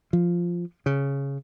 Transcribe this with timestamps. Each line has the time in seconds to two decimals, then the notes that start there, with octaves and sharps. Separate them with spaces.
0.13 F3
0.86 C#3